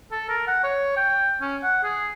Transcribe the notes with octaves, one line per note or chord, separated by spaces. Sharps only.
A4
A#4
F#5
C#5
G5
C#4
F#5
G#4